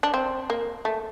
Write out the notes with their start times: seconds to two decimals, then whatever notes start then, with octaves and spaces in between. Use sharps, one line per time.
0.03 D4
0.14 C4
0.50 A#3
0.85 A3